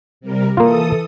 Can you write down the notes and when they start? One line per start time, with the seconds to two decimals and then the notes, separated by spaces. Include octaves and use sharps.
0.21 C3 G3 A#4
0.57 E3 A#3 F4 A4 D#6